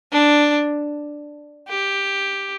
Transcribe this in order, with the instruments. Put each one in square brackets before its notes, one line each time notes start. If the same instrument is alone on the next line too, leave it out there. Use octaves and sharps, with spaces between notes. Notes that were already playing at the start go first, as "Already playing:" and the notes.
[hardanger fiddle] D4
G4